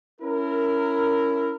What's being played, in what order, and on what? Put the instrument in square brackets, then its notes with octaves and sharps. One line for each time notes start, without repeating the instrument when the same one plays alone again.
[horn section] C#4 E4 A#4